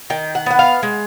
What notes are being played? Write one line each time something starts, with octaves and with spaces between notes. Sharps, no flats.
D#3 G5
F#5
B3 F#5
F5
G#3